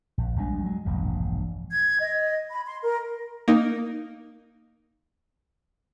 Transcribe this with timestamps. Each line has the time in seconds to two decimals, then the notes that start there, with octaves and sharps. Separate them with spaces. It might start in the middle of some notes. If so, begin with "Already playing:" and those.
0.18 A#1
0.36 A#1 G3 G#3 D4
0.64 F#3 G#3
0.85 E1 A#1 G2
1.70 G#6
2.00 D#5
2.48 B5
2.66 C6
2.82 A#4
3.48 A#3 D#4